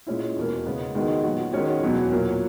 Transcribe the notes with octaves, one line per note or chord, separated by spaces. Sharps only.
A#2 G#3 C#4 E4
E2 B2 A#3
C#3 G#3 B3
D#3 G#3 B3 D#4 F#4
A#2 F#3 B3 F#4
D#3 G#3 C#4 F#4
E2 B2 F#3
A#2 F#3 A#3